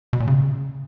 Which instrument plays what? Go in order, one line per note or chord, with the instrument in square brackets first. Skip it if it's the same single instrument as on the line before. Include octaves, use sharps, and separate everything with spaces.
[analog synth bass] B2
A#2
C#3